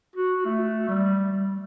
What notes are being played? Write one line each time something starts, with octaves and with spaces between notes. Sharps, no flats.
F#4
A3
G3
G3